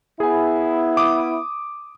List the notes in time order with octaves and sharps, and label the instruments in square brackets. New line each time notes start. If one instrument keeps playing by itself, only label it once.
[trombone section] B3 E4 [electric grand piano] G#4 G#5
[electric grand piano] D6 D#6